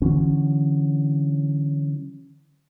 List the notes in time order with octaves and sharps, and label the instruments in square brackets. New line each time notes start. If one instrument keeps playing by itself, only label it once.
[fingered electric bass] D3 E3 F#3 C#4